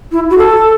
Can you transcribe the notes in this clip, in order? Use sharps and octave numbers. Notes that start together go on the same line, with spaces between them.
E4
F#4
A4